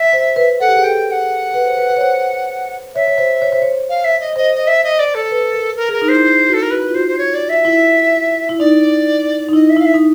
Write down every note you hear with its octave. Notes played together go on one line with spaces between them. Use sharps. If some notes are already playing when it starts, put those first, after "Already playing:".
Already playing: E5
C5
B4
A4 F#5
G4
G#4
A4 G5
G5
F#5
B4
C5
B4
B4
C#5
C5
C#5 E5
C#5
C5
C#5
C5
C#5
F5
E5
D#5
C5 D#5
D#5
E5
D#5
D5
A4
B4
A#4
A#4
G#4
A#4
D#4
E4 C5
F#4
A4
A#4
F#4 B4
F4
F#4 C5
C5
C#5
D5
E5
E4
E4
D#4 D5
D#4
E4 D#5
E5
E4
F5
E5
D#4